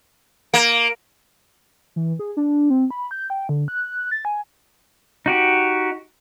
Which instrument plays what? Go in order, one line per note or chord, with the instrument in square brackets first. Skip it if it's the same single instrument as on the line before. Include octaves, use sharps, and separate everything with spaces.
[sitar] A#3 [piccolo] D7
[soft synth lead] E3
G#4
D4
C4
B5
G6
G5
D3
F#6
A6
G#5
[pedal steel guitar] D#4 F#4 G4